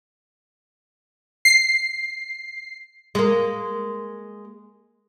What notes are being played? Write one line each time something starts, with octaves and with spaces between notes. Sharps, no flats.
C7
G#3 A#3